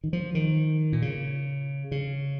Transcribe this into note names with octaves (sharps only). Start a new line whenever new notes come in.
D#3
F3
D#3
A#2
C#3
C#3